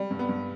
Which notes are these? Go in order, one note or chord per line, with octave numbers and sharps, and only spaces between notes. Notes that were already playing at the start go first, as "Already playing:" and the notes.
Already playing: G3
G2
B3
G2